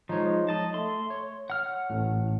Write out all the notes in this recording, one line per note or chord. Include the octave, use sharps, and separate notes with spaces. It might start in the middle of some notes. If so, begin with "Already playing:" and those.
F3 G#3 D#4 C#5
D#5 A5
A3 C6
C#5
F#5 F6
A1 A2